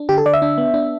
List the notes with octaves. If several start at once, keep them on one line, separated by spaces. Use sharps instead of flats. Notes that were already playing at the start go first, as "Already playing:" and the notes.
Already playing: D4
D3 G4
A4
D3 D5
E5
D4
B3
D4